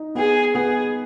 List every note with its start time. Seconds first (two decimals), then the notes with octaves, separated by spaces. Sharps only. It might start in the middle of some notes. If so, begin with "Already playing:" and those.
Already playing: D#4
0.15 B3 G#4
0.54 B3 G#4